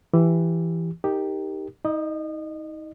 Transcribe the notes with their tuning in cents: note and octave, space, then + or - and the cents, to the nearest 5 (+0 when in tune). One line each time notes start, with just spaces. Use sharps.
E3 +15 G4 +0
D#4 +0 G4 +0 A#4 -15
D#4 +30 D#5 -30